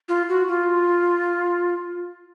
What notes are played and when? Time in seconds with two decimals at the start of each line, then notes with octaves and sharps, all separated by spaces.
0.08 F4
0.29 F#4
0.48 F4